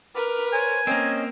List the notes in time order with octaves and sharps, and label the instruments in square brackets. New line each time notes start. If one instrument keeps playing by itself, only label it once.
[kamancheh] A#4 B4 [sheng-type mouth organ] B5 D6 F6
[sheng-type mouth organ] C5 C#5 [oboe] G#5
[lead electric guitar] A#3 C4 [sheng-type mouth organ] C#4 D#5